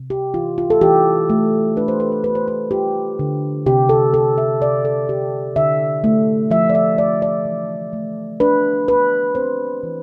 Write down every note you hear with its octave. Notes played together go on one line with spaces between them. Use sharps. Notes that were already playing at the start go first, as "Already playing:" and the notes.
Already playing: C3
G4
E3 F4
F4
A4
E3 G4
A3
D4 B4
C5
B4
C5
D4 B4
C5
B4
F4 G4
D3
C3 G4
A4
C3 A4
E5
C3 D5
A4
C3 G4
D3 E5
A3
F3 E5
D5
E5
A3 D5
D5
E3
A3
D4 B4
D4 B4
C4 C5
E3